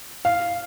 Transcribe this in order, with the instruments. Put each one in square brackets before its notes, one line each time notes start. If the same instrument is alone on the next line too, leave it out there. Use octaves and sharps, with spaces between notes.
[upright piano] F5